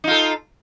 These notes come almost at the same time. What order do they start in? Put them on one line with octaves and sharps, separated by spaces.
D#4 F4 A4